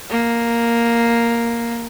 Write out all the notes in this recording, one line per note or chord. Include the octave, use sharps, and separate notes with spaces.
A#3